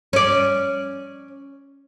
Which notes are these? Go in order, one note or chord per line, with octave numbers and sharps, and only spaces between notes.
C#4 D5